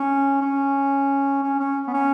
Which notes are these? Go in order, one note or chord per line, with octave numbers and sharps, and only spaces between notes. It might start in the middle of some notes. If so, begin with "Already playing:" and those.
Already playing: C#4
C#4
C#4
C#4
B3
C#4